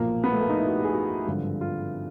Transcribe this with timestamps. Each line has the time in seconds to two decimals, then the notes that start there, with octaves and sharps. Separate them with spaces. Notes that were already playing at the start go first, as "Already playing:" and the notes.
Already playing: B1 A#2 F3 A#3
0.24 B3
0.32 A3
0.41 A#3
0.49 D#4
0.58 E4
0.67 F#4
0.75 G4
0.84 G#4
0.93 F#4
1.26 G#1 G2 D3 F3
1.61 F4